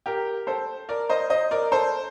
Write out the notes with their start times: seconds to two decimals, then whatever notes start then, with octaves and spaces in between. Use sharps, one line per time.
0.06 G4 A#4
0.47 A4 C5
0.89 A#4 D5
1.09 C5 D#5
1.30 C5 D#5
1.51 A#4 D5
1.72 A4 C5